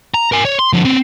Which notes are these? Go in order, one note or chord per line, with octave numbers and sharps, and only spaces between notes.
A#5
A#4 G#5
C#5
C6
D3 F3
B3 C4